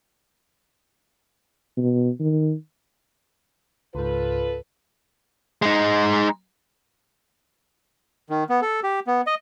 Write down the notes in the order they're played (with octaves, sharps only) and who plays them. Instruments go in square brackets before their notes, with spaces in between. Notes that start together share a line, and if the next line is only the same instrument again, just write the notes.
[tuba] B2
D#3
[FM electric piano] C#2 G#2 [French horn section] F4 A4 B4
[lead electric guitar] G#3 D#4
[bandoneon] D#3
B3
A4
G4
B3
D#5